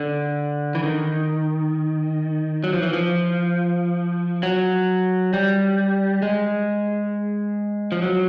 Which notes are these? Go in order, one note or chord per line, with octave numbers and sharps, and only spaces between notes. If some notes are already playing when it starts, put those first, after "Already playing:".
Already playing: D3
E3
D#3
F#3
F3
E3
F3
F#3
G3
G#3
F3
F#3